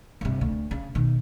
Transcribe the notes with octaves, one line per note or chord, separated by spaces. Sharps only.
G1 C3
D2
C#3
B2 D#3